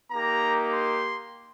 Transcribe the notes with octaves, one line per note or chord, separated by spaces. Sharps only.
A#3 D#4 G4 A#5
C6